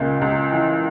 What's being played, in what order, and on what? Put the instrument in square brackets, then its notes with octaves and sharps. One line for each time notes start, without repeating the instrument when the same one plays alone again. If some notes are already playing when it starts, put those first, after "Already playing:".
Already playing: [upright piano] C#2 A#2 C#3 A#3
C#2
E3